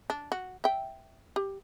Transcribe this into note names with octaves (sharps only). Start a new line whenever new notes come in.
D4
F#4
E5 G5
G4